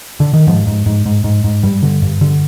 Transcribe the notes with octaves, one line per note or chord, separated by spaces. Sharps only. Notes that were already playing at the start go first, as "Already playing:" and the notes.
D3
D#3
G#2 F3
G#2
G#2
G#2
G#2
G#2
G2 G3
D3
G2
D3